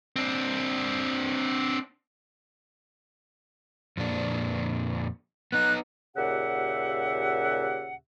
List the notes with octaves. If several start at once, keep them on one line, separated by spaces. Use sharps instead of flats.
C4 D4
F2 A#2 D4
B3 D#4 F#6
D#2 A#2 C#3 G4 E5 F#5